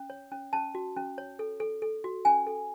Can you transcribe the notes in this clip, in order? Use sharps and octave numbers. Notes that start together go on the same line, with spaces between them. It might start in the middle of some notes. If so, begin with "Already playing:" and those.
Already playing: C#4
C#5
C#4
C#4 A5
F#4
C#4
C#5
A4
A4
A4
F#4
C#4 G#5
A4